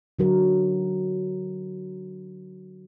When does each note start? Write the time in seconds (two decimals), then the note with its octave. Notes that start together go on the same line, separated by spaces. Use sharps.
0.19 D3 F#3 A#4